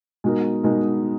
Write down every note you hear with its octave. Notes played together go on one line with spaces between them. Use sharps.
B2 G#3 D#4 F#4 A#4
B2 G#3 D#4 F#4 A#4